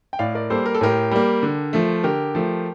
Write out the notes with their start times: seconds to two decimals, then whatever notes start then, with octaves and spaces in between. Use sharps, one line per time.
0.13 G5
0.19 A2 D5 F5
0.35 A#4 D5
0.50 G3 A#3 A4 C5
0.66 A#4
0.75 A4
0.81 A2 G4 A#4
1.11 G3 A#3
1.43 D3
1.73 F3 A3
2.04 D3 G4 A#4
2.35 F3 A3